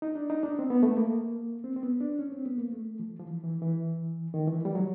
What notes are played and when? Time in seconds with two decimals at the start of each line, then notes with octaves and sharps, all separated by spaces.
0.02 D#4
0.15 D4
0.30 D#4
0.43 D4
0.59 C4
0.70 B3
0.83 A3
0.97 A#3
1.64 C4
1.76 C4
1.83 B3
2.01 D4
2.19 C#4
2.32 C4
2.46 B3
2.58 A#3
2.73 A3
2.99 F3
3.19 F3
3.26 E3
3.44 E3
3.62 E3
4.34 D#3
4.47 E3
4.65 G3
4.75 F#3